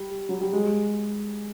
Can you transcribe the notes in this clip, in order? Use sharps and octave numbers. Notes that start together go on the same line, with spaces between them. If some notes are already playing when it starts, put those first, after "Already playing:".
Already playing: G3
F#3
G3
G#3